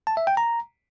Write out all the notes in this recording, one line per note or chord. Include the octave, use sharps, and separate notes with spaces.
A5
E5
G5
A#5